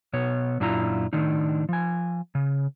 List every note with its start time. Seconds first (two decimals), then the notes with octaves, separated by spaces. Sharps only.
0.13 B2 B3 C#5
0.60 F#2 A#2 D4 E4 F4 A#5
1.13 A2 D#3 D4 D#4
1.69 F3 G#5
2.35 C#3